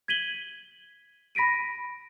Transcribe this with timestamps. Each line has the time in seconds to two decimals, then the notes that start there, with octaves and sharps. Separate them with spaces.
0.08 G#6 B6 D#7 F#7 G7
1.35 B5 A#6 B6 D7 D#7